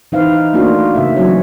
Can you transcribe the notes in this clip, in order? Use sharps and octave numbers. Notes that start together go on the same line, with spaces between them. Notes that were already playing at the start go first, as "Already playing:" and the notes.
E3 D#4 B4 C5 F5
A3 A#3 D4 F4 F#4
C#3 E5
E3 F#3 C#4 F#4 C#5